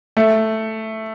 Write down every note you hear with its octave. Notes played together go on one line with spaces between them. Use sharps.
A3